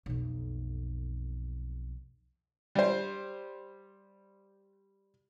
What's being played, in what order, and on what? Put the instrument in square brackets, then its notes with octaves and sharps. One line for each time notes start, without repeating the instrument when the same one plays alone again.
[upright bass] B1 F2
[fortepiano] G3 C5